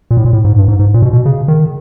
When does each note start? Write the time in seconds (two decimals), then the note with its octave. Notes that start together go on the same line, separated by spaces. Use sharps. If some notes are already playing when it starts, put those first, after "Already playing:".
0.11 A#2
0.17 A2
0.25 A#2
0.33 A2
0.45 G#2
0.56 G2
0.68 G#2
0.79 G#2
0.94 A#2
1.02 B2
1.13 B2
1.26 C#3
1.48 D#3